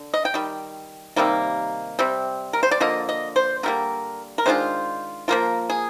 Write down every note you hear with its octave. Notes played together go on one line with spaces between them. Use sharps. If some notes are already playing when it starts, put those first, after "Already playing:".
Already playing: D3
D#5
G5
D#3 G3
C3 D#3 G3 A#3
C3 G3 C4
A#4
C5
D5
D3 F3 A#3 D#5
D#5
C5
D3 G3 A#3 A#4
A#4
D#3 G#3 D4 F4 C5
F3 A#3 F4 A#4
G#4